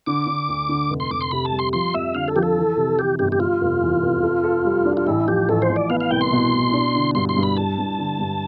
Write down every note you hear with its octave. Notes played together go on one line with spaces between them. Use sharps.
D3 D6
D3
D2
D3
F1
C6
F1 D6
C6
C3 B5
A5
G3
C6
F3 C6
F2 E5
D3 F5
A4
F3 G4
A4
E3
C3
E3 G4
G1 G4
G4
G3 F4
F1
E2
F1
A4
A4
G3
D4
F4
A1 E4
F3 G4
A1 A4
C5
A1
D5
B3 F5
F5
C2 G5
C6
B2
B2
D4
D3
G2 C6
C6
G2
B5
G2 A5
G2
D3
G2